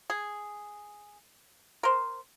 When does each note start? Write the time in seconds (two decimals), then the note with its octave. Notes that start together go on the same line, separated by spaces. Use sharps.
0.10 G#4
1.83 A#4 C5